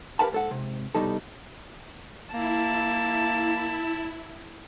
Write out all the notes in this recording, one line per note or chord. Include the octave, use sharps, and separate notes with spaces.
G4 A#4 B4 F5 F#5 A5
G#2 A4 F#5
G#2 C3
C2 B2 G3 D#4 A4
A#3 E4 A5